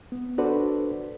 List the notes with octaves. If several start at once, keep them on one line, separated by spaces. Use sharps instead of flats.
B3
D4 F#4 A4 B4 C5 D5